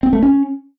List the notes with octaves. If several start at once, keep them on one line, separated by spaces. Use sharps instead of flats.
C4
A3
C#4